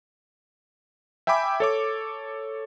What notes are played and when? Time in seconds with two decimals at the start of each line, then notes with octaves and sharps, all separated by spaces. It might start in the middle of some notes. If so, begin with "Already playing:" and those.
1.27 E5 G5 G#5 B5 D6
1.60 A4 C#5 D6